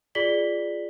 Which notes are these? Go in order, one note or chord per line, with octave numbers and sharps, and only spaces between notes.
F4 G#4 D5 B6 F#7 G7